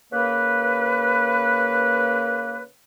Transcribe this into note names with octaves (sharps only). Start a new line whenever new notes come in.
C#3 A#3 A#4 B4